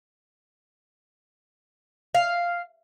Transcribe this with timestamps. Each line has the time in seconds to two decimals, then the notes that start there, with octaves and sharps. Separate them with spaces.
2.15 F5